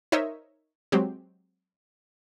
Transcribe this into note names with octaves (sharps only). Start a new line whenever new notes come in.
D#4 A#4 C5 C#5 D#5 E5
F#3 G#3 C4 G4